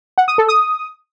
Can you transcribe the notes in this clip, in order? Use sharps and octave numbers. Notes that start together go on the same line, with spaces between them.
F#5
D#6
A4
D#6